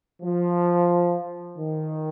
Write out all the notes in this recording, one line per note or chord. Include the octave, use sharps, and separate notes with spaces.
F3
D#3